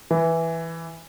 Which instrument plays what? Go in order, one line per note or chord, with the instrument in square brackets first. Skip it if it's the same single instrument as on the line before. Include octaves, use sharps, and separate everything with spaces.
[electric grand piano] E3